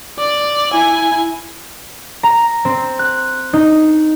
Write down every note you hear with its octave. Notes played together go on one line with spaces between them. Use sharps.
D5
E4 G#5
A#5
C4
F#6
D#4